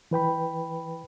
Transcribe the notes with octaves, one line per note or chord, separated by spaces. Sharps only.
E3 B4 G5 B5